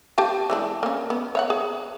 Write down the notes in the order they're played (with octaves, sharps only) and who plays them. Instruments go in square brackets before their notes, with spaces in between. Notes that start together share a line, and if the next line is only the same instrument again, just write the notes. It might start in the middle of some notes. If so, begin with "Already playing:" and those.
[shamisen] G4 F5 A5
E3 G#3 D4
A#3 C#4
B3
C#5 F5 F#5
G#4